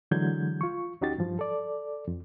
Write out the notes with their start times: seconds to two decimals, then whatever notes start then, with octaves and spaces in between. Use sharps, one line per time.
0.11 D3 E3 F#3 G#3 G6 G#6
0.61 F4 C#6
1.01 D2 C#4 D#4 F#4 G4 A6
1.18 G2 F3
1.39 A4 D5
2.08 F2